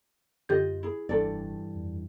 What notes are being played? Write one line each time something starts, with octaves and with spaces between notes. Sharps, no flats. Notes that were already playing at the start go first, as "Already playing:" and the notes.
F#2 D3 F4 G4 D#5 G6
E4 G#4
F1 G2 E3 D4 A4 D5
F2